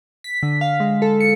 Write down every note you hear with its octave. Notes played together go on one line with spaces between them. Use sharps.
B6
D3
F5
G#3
A4
C#7